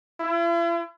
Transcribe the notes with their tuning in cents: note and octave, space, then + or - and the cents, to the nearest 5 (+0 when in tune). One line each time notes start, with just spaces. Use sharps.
E4 +45